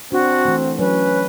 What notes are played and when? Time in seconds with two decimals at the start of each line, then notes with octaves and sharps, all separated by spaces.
0.12 C4 D4 F#4
0.45 E3 A3
0.79 F#3 C#4 B4